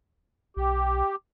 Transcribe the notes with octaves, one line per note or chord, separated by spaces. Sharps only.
B1 G4